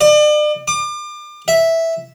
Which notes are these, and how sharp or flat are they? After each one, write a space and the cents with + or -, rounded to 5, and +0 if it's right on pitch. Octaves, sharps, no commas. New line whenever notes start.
D5 +40
D6 +35
E5 -5